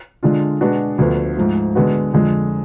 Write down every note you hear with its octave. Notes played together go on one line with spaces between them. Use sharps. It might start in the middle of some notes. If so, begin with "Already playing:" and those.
D3 G#3 D4 F4
B2 G#3 B3 D4 F#4
D2 D3 F3 B3
G#2 F3 A3
D3 G#3 B3 F#4
F2 D3 G#3